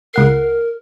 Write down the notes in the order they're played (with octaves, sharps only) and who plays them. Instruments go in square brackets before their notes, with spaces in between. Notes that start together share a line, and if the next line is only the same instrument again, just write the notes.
[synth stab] C#2 F#5 C7 [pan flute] A#4